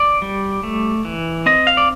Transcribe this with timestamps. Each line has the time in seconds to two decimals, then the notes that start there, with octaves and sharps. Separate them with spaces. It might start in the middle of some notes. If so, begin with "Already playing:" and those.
Already playing: D5
0.22 G3
0.63 A3
1.05 E3
1.46 C4 D#5
1.67 F5
1.77 D5